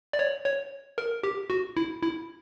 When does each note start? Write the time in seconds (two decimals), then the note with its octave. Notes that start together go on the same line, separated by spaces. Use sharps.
0.13 D5
0.19 C#5
0.45 C#5
0.98 A#4
1.23 G4
1.50 F#4
1.77 E4
2.02 E4